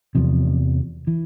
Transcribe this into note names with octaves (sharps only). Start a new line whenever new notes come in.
E2 C3 F3
E3